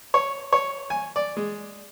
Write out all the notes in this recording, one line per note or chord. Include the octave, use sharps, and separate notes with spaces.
C#5
C#5
G#5
D5
G#3